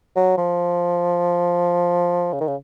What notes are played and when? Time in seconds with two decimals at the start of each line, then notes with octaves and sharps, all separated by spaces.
0.16 F#3
0.38 F3
2.33 C#3
2.41 D#3
2.48 C#3